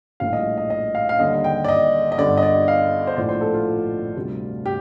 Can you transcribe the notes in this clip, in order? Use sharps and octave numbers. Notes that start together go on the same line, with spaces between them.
A#1 A2 G3 F5
D#5
D#5
D#5
F5
F5
D#2 D3 G3 D#5
G5
D5
D#5
D#5
G1 G2 D3 D5
D#5
D5
F5
C5
A#1 A2 F3 D5
C5
A4
F4
D2 C3 G3
G4